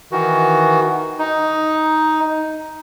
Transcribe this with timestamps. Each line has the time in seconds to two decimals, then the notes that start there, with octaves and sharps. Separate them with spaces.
0.12 D#3 E3 F#4
1.19 D#4